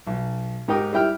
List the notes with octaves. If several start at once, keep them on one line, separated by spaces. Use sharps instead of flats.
B1
G#2 D#4 G4 A#4 G5 D#6
G3 E4 G5 F6